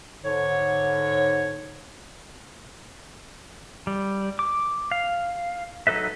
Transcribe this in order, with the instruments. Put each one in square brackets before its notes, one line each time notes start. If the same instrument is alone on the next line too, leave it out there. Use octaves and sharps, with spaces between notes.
[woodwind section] G#2 D3 C#5
[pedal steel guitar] G3
D6
F5
F#3 D#4 A4 B4 E5